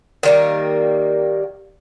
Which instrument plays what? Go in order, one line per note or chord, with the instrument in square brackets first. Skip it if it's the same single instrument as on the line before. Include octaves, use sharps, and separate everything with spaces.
[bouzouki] D#3 G3 A#3